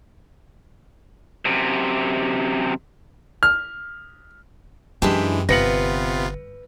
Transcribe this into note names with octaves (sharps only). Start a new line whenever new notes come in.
F#2 C3
F6
F#2 E3 G#3 D4 E4 G4 G5
G1 C3 B3 F4 B4 A#6 C#7 F#7